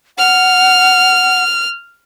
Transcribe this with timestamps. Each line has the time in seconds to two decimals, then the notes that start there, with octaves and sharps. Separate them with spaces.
0.18 F#5 F6